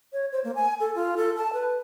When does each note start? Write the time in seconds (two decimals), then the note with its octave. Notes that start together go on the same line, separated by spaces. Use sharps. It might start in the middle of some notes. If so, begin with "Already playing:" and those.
0.13 C#5
0.32 C5
0.44 A#3
0.55 G#5
0.80 A4
0.95 F4
1.17 A4
1.37 A5
1.53 B4